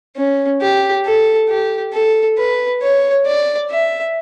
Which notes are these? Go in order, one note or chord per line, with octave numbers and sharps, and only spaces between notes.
C#4
G4
A4
G4
A4
B4
C#5
D5
E5